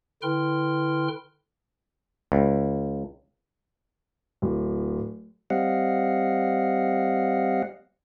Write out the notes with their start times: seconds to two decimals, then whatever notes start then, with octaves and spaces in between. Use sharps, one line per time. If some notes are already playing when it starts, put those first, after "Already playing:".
0.22 D3 E4 B4 G5 C6 F6
2.32 C#2
4.42 D1
5.50 G3 C4 D#5 F5 F#5